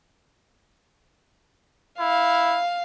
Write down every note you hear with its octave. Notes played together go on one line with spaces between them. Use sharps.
E4 F5